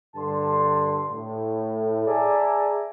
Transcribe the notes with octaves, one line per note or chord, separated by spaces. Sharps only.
G2 D3 A5 C6
A2
G#4 D5 E5 A5 A#5